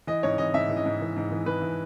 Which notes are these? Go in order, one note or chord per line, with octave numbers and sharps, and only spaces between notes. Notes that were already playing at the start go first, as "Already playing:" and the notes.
E3 D#5
G#2 C#5
E3 D#5
G#2 E5
E3
D#5
G#2
E3
G#2
E3
G#2 B4
E3